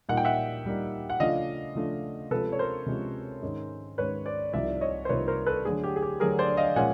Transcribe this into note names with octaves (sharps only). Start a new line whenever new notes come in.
A#2 G3 A#3 D#4 F#5
G5
E5 F#5
A#2 G3 A#3 D#4
F#5
C#3 F3 A3 D4 F4 D#5 F5
C#3 F3 A3 D4 F4
C3 F3 G#3 C#4 A4 B4
C#5
A#4 C5
C3 F3 G#3 C#4
G#2 D#3 G#3 C#4
G#2 D#3 G#3 C#4 B4 C#5
C5 D5
C2 C3 F3 A#3 D#4 D5 E5
C#5 D#5
C5
C2 C3 F3 A#3 D#4 B4 C#5
A#4 C5
A4 B4
D3 F#3 A3 D4 G#4
G4
G#4
G4
D3 F#3 A3 D4 G#4 A#4
C5 D5
D#5 F5
A#2 F3 G#3 C#4 F4 F#5 G#5